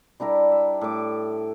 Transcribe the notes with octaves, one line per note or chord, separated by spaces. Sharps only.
G3 D4 E4 A#4
E5
A2 D6